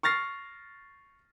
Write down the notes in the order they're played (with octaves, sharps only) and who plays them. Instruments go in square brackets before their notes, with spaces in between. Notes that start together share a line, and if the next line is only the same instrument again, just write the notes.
[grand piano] C#6 F6 A6 A#6 C7